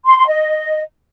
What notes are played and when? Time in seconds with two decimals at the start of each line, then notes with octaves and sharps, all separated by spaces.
0.05 C6
0.16 C6
0.26 D#5